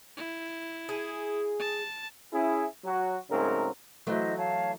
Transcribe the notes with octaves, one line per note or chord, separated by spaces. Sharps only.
E4
G#4
A5
C#4 E4 G#4
F#3 F#4
G#2 C#3 F#3 A3 C4 A#4
E3 F#3 A3 E4 C5 D#5
C#5 F5 A5